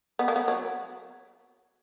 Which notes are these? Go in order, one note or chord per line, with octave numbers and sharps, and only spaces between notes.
B3
A#3
B3
F#3